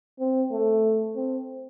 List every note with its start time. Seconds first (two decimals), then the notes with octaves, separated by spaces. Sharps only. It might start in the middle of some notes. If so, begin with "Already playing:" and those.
0.20 C4
0.52 A3
1.16 C4